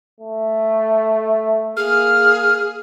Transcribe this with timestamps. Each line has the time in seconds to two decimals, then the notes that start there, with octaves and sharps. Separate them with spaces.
0.20 A3
1.77 A#3 G#4 F6